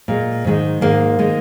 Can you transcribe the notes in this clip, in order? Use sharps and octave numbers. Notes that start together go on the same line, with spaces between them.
A#2 G#3
G#2 D#3 G#3
G#2 D#3 G#3 A#3
D#3 G#3